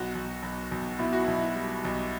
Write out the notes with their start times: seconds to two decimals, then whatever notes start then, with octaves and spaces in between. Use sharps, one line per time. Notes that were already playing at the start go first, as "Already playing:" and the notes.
Already playing: B1 F#4
0.15 B1
0.43 B1
0.71 B1
0.99 B2 E4
1.13 F#4
1.24 B1 E4
1.55 G3
1.85 B1